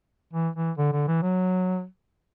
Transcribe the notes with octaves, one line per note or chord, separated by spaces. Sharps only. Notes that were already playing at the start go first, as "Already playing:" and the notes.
E3
E3
D3
D3
E3
F#3